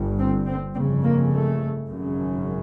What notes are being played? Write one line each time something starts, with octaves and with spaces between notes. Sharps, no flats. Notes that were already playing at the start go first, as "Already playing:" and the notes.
Already playing: G1 G2
C4
C4
G1 F2 C#3 C4
A#3
A3
G#1 F#2 C#3